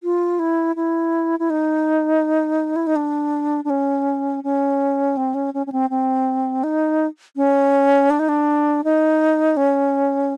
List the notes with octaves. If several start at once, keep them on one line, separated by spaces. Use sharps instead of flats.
F4
E4
E4
E4
D#4
E4
D#4
D4
D4
C#4
C#4
C4
C#4
C#4
C#4
C4
C4
D#4
C#4
D4
D#4
D4
D#4
C#4